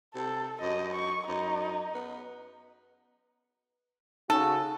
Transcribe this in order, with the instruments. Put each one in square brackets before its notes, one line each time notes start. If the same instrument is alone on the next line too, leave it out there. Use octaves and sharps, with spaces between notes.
[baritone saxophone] C3 [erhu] A4
[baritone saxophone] F#2 [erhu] D#5
[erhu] C#6
[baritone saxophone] F#2 [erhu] D#4
[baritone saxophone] B3
[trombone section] C#3 F#4 [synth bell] D#4 [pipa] A4